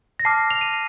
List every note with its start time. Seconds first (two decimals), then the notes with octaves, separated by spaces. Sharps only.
0.20 A#6
0.25 A5 D6 F6 C7
0.50 F7
0.61 D#7